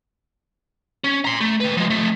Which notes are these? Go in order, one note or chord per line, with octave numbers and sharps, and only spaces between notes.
C#4
A#5 C6
A3
D#3 B4
F3 G#3
F3 A3